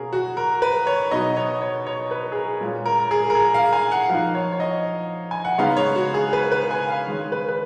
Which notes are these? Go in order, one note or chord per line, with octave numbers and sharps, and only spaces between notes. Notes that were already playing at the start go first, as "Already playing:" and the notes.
Already playing: B2 A#3 C#4 G#4 A#4
F#4
A#4
B4
C#5
B2 F#3 B3 D#4 D#5
C#5
C#5
C#5
B4
G#4
A#4
A#2 G#3 C#4
A#4
A#4
G#4
A#4
G#4
F5
G#5
F#5
F3 A#3 D#4 F5
C#5
C#5
D#5
G#5
F#5
C#3 G#3 B3 D#4 F5
C#5
F#4
G#4
B4
B4
G#5
F5
D#3 G#3 C#4
B4
B4